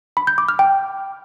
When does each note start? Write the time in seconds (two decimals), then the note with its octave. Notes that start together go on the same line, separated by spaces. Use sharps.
0.17 B5
0.27 G6
0.38 D6
0.49 F6
0.59 G5